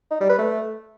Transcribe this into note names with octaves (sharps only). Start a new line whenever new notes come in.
D#4
G3
B4
A3